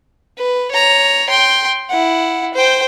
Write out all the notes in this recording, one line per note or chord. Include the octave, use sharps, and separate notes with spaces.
B4
C#5 A#5
G5 C6
E4 F#5
C5 G5